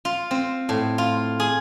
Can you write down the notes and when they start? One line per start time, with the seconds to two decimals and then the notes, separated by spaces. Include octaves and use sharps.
0.05 F4
0.31 C4
0.69 A2
0.98 F4
1.40 G#4